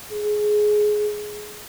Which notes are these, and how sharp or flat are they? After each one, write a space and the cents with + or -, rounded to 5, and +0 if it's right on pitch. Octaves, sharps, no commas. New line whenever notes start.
G#4 +15